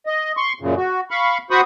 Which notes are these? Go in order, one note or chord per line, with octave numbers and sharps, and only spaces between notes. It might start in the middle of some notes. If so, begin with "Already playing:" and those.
D#5
C6 C#6
F#2 A#2 C#3
F#4
F5 B5 C#6
F#4 C5 B5 C#6 D#6